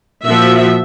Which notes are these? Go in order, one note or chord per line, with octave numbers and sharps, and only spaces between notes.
A#2 F3 F#4 E5